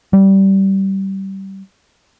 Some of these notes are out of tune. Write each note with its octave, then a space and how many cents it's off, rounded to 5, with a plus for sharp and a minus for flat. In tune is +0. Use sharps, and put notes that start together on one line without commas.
G3 -20